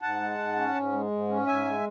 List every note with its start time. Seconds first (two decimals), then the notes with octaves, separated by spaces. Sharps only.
0.02 G#2 F#5 A5
0.20 G#3
0.38 G#2
0.56 C#4
0.75 G#2
0.92 G#3
1.11 G#2
1.28 C#4
1.47 G#2 E5 G#5
1.65 G#3